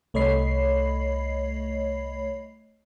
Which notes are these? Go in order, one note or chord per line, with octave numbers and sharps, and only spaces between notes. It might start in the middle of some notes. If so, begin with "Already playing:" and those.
C2 A3 C#5 D#5 B5 C7